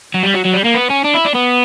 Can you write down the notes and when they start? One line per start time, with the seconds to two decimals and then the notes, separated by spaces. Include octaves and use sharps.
0.14 F#3
0.23 G3
0.34 F#3
0.45 F#3
0.53 G3
0.64 A#3
0.74 B3
0.90 C#4
1.05 D4
1.15 E4
1.25 D4
1.35 B3